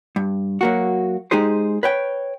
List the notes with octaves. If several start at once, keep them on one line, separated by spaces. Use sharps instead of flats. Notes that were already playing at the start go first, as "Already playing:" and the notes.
G2
F#3 A#3 F#4
G#3 D#4 G4 G#4 C5
B4 C#5 G5